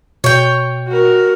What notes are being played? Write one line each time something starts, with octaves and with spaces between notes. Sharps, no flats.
B2 C#5 G5
F#4 A#4